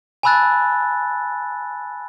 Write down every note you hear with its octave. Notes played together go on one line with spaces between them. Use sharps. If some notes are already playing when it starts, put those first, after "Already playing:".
G#5 A5 B5 E6 F#6 A6